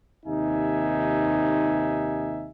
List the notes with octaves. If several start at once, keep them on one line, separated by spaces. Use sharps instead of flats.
D#2 C3 D#4 E5 G#5